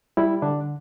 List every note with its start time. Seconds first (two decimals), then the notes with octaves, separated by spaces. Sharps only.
0.17 G3 E4
0.42 D3 D4